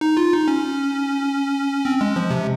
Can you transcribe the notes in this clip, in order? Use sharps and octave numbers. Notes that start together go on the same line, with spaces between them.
D#4
F4
D#4
C#4
C4
G#3
F3
C3